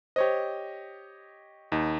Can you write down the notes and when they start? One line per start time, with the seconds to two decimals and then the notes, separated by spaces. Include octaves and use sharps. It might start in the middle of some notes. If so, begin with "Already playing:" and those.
0.16 G4 C5 C#5 D#5 C#6
1.72 D#2 D#4